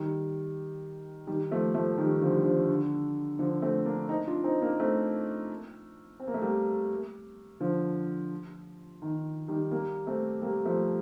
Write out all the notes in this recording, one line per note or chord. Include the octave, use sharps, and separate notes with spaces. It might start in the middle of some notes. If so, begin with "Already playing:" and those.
Already playing: D#3 G3
D#3 G3
F3 A3
F3 A3
D#3 G3
D3 F3
G3
D3 F3
D3
D3 F3
A3 C4
A#3 D4
C4 D#4
D4 F4
C4 D#4
A#3 D4
A3 C4
C4
A#3
A3
G3 A#3
D3 F3
D#3
D#3 G3
G3 A#3
A3 C4
G3 A#3
F3 A3